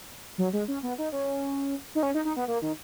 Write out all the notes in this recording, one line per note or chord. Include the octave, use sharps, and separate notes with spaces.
F#3
G#3
C#4
B3
D#4
C#4
D#4
C#4
D#4
D#4
B3
A#3
D#3